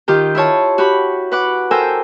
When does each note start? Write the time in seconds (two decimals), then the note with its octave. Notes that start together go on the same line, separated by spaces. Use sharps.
0.08 D#3 F4 G4 G6
0.35 E4 F4 C#5 A5
0.78 F#4 G4 B5
1.32 B4 F#5 D6
1.71 A4 A#4 C5 G5 G#5 E6